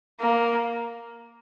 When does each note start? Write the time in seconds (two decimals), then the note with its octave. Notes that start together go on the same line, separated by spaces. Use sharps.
0.21 A#3